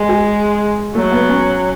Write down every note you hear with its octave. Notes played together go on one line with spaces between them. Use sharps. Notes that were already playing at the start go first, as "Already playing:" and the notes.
Already playing: G#3
G#4
F#3 A3
B3
C#4